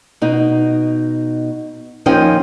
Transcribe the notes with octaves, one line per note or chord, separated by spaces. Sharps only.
B2 D#4
D#2 F3 C#4 D#4 D#5 G5